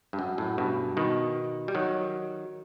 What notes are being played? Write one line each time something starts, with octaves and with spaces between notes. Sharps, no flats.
G2
F#2
F#2 A2
G2 B2
B2 D#3
G3
D#3 F#3